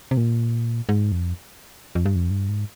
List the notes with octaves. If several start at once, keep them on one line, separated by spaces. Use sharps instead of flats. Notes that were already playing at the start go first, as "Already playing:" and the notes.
C3
A#2
G#2
F2
F2
G2
F2
G2
G#2